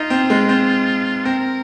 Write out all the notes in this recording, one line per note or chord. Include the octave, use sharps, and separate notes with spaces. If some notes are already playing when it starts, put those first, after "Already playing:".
Already playing: D#4 F4
C4
G#3
C4
C4 A#4